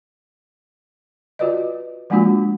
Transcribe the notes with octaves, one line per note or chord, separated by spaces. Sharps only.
F4 F#4 B4 D5 D#5
F3 G#3 A#3 D4 F4 F#4